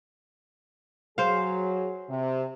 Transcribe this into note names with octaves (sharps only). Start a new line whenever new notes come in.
F#3 G#4 C5 F5
C3